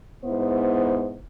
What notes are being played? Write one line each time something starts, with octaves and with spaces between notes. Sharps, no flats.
G#2 B3 E4 C5